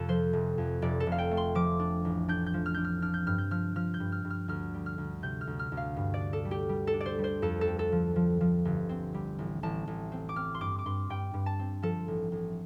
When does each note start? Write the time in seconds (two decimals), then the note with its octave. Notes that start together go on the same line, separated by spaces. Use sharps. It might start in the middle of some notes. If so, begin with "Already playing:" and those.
Already playing: F2 C3 A4
0.08 F3 C5
0.33 F1
0.58 F2
0.82 F1 D5
1.00 A4
1.07 F1
1.12 F5
1.18 G5
1.31 A3
1.37 C6
1.55 F3 D6
1.79 D4
2.05 A1
2.28 D4 G6
2.46 G6
2.54 F3
2.66 F6
2.74 D4 G6
2.84 F6
3.02 D4 F6
3.14 G6
3.27 G2 F6
3.38 G6
3.51 F3 F6
3.76 F3 F6
3.94 G6
4.00 G2
4.12 F6
4.25 G2
4.30 F6
4.48 D2 F6
4.74 G3
4.86 F6
4.98 D2
5.23 C3 G6
5.41 F6
5.47 D2
5.59 F6
5.72 D2
5.77 F5
5.97 G2
6.14 D5
6.20 D4
6.33 A4
6.45 G3
6.51 G4
6.69 G3
6.87 A4
6.94 D4
7.01 D5
7.06 C5
7.19 G3
7.24 C5
7.42 F2 A4
7.61 A4
7.67 C4
7.79 A4
7.92 F3
8.16 F3
8.41 F3
8.65 G1
8.89 C4
9.14 G3
9.39 A1
9.63 A1 A5
9.87 A1
10.12 C4
10.29 D6
10.36 C4 F6
10.55 C6
10.61 G2 D6
10.79 D6
10.86 G2 C6
11.10 G2 G5
11.34 G2
11.46 A5
11.59 C4
11.83 F3 A4
12.08 A1
12.32 A1